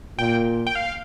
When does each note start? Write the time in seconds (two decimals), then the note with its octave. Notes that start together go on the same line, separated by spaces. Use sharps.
0.18 A#2 G5
0.67 G5
0.75 F5